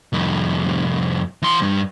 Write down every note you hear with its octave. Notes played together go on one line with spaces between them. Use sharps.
C2 F2
E3 C6
G2